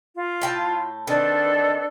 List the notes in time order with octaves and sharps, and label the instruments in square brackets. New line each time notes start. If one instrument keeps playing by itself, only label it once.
[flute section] F4
[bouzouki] A2 G5 A5
[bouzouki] D#3 C4 [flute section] D4 A4 B4